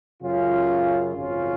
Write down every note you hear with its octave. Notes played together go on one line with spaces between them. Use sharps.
F#2 C#3 F#3 C#4 F4
G#1 F#2 C#3 F3 C#4 F4